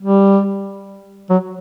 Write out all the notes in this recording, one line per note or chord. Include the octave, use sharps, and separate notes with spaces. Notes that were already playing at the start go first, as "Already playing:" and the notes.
G3
F#3